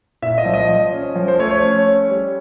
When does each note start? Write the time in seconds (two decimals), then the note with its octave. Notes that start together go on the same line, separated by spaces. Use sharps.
0.22 A#2 E5
0.38 D#5
0.45 F3
0.53 D#5
0.69 F3
0.92 C#4
1.16 F3
1.28 C5
1.39 A3 C#5
1.51 C#5
1.63 C#4
1.86 C#4
2.09 G3